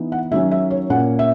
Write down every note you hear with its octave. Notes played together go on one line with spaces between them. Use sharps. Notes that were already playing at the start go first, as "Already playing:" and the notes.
Already playing: E3 B3 D#4
F#5
D#3 F#3 C#4 E5
E5
C#5
A#2 A#3 C#4 F#5
E5